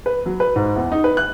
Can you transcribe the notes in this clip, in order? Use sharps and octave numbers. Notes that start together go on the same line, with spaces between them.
B4
F#3
B4
G#2
E2
D#4
B4
F#6